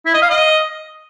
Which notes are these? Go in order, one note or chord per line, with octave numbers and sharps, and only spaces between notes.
E4
D#5
F5
D#5